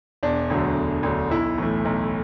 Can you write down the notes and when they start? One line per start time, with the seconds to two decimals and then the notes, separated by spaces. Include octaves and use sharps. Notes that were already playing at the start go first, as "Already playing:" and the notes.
0.23 E1 D4
0.50 D2 D3 F#3
0.76 E1
1.03 D2 D3 F#3
1.31 B1 E4
1.58 A2 E3 A3
1.85 B1